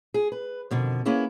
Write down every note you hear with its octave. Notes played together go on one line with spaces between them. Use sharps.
G#4
B4
F2 B2 D3 D#3
A#3 B3 C#4 E4 G#4